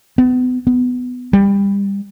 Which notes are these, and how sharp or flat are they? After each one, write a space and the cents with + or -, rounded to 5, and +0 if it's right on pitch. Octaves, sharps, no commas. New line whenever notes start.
B3 +35
B3 +15
G3 +25